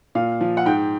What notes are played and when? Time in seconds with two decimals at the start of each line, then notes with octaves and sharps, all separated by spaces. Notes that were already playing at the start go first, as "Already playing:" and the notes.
0.15 A#2 F5
0.41 F3
0.57 F#5
0.66 G#2 G5